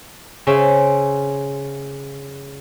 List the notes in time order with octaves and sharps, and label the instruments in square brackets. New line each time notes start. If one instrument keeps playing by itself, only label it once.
[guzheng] C#3 C#4 C5 E5